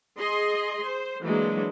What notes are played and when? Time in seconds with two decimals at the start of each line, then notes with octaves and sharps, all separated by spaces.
0.18 G#4 D#5 C6
0.85 C5
1.22 E3 F#3 G#3 A#3 D4